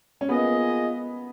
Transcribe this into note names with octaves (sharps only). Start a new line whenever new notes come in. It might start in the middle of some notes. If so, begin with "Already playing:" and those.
C#4
A#3 B3 F4 G#4 D#5